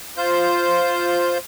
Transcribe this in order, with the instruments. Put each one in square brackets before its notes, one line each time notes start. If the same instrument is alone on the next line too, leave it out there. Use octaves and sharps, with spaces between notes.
[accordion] F4 C5 G6